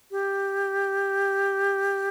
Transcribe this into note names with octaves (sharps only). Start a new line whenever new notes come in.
G4